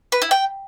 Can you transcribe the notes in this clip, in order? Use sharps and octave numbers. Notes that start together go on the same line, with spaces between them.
B4
E4
G5